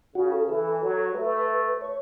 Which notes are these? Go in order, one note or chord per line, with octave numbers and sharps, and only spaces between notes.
C#3 F#4
A4
E3 A4
F#3
A3 B4
C#5